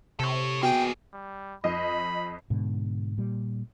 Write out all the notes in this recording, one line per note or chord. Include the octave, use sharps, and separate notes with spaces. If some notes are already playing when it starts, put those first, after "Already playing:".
C3 A4 C#5
B2 A#3 G#4 G5
G3
F2 D#5 B5
G#2 B2 D3
A#2 G3